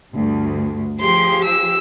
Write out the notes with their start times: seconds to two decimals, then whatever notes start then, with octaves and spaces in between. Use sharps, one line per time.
0.14 D2 G2
1.01 F3 G4 G#4 C6
1.45 E6